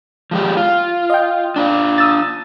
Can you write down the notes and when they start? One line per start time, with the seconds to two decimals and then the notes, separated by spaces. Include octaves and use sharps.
0.31 F3 G#3 G4
0.57 F4
1.10 D#5 G5
1.56 D4 F4
1.98 D#6 E6 A6